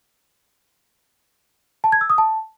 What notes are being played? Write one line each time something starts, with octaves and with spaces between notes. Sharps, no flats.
A5
G#6
E6
D#6
A5